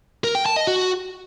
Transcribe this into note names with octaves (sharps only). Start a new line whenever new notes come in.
A#4
G5
A5
D#5
F#4